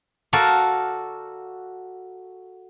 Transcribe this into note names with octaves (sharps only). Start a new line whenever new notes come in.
F#4 A4 A#4 D5 F5